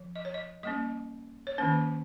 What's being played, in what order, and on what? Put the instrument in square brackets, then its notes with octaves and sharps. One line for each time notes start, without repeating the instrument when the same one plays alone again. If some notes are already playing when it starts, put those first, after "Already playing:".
Already playing: [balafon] F3
D#5
C#5
D#5
G3 A#3 C#4 D#5
C#5
D#3 A#3 C#4 C5